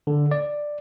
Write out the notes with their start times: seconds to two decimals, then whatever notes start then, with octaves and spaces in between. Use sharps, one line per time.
0.07 D3
0.31 D5